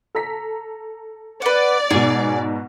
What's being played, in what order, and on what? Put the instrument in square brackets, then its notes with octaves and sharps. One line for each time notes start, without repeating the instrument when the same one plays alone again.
[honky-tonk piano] A4 A#5 B6
[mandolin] B4 F#5 [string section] D5
[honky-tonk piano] G#2 B2 [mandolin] G#4 C#5